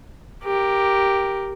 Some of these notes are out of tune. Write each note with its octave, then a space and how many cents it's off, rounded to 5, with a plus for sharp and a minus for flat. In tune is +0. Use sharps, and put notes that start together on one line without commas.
G4 +0 A#4 +0